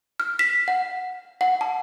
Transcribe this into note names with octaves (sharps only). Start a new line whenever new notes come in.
F6
B6
F#5
F#5
A5